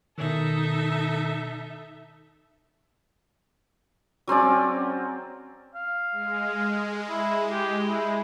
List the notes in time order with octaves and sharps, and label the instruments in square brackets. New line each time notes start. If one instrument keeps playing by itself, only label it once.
[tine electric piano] B2 D#3 [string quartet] D#4 A4 E5
[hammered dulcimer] F#3 C4 C#4 D5
[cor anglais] F5
[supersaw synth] G#3
[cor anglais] E4
G4
E4